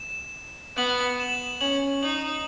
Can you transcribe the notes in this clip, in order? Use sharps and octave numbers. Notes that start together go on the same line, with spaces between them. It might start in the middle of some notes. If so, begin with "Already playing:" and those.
Already playing: E7
B3 F#7
F#7
E7
C#4 F#7
D#4 F#7